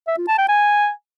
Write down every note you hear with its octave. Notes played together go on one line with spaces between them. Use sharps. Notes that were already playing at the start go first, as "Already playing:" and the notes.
E5
F4
A5
G5
G#5